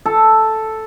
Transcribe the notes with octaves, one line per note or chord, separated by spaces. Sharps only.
A4